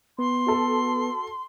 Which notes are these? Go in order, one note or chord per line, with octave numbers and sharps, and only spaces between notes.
B3 C6
F#4 A4